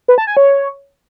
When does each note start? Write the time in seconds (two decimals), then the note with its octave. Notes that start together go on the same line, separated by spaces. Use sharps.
0.08 B4
0.18 A5
0.27 G#5
0.37 C#5